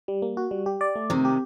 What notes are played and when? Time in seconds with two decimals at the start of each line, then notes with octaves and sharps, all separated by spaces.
0.08 G3
0.22 A#3
0.37 F#4
0.51 G3
0.66 G4
0.81 D5
0.95 A3
1.10 C3 D#3 C4
1.25 G4